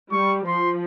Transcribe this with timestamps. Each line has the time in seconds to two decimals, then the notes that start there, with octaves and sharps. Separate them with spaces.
0.12 G3 C#6
0.46 F3 C6